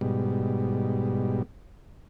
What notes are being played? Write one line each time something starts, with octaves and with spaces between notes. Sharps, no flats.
G#2 B2 G3